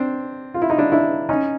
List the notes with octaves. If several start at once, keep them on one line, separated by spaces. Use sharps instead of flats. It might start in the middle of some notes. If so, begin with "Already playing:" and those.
Already playing: C4 D4
F4
E4
D#4
D4 E4
D4 E4
C#4 D#4